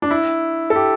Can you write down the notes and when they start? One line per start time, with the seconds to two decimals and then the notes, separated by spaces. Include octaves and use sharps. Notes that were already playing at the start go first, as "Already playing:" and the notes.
0.02 D4
0.11 E4
0.70 A4
0.76 G4